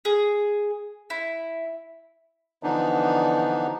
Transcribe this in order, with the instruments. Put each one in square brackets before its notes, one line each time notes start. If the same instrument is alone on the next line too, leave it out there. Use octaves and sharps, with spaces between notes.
[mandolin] G#4
E4
[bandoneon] D3 E3 F3 B3 D4 D#4